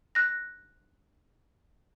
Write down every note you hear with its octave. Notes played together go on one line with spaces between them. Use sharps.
F#6 A#6